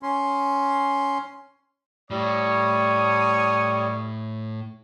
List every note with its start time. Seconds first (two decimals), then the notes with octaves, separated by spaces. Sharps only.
0.03 C#4 C6
2.10 A2 G3 C#5 D#6